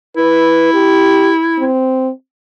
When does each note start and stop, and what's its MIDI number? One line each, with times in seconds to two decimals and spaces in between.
0.17 1.66 64
0.17 0.69 71
0.74 1.32 67
1.59 2.10 60